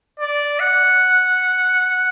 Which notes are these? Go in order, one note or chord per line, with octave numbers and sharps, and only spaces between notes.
D5
F#5